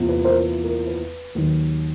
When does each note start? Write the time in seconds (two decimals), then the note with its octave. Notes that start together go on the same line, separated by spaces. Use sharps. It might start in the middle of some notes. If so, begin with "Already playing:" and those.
Already playing: E2 C3 F3 A#3
0.09 B4
0.24 A#4 C5
0.40 B4
0.64 A#4
0.87 B4
1.35 D#2 D#3 F#3